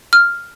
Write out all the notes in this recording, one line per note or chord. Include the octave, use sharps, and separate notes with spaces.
F6